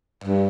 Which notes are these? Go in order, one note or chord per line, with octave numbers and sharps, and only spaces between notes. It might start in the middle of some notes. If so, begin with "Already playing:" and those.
G2